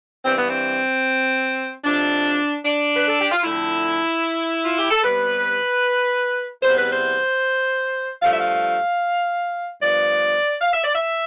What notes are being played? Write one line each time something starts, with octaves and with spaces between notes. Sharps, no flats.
G2 E3 B3 C4
B3
C4
F2 C3 F3 D4
D4
B4
A4
G4
F4
F2 D3 A3 E4
F4
G4
A4
C3 G3 B3 B4
E2 C3 G3 B3 C5
B4
C5
G2 F3 A3 F5
E5
F5
G2 F3 B3 D5
F5
E5
D5
E5